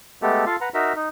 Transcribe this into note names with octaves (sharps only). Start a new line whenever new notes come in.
G#3 A3 B3 G4 A4
F4 A4 F5
B4 F#5 A#5
D#4 F#4 A#4 E5
D#4